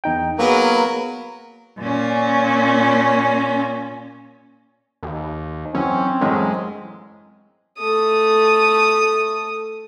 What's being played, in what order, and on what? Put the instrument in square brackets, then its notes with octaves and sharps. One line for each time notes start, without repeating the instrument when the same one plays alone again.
[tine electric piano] E2 D#4 G5
[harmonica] F#3 A#4 B4 [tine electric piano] A#3 B3 G#4
[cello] A#2 C#4
[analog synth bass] D#2
[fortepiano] F#2 E3 [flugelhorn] C4 [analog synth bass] C#4
[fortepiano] A1 F#2 D#5 [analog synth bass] G#3
[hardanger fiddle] A3 D#6